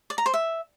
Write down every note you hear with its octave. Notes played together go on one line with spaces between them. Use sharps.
D5
A#5
C5
E5